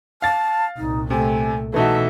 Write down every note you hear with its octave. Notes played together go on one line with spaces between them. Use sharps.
F5 A5 A6
C2 A#2 D#4
C3 A3 G#5
B2 E3 A3 D#4 F#4 E5 A5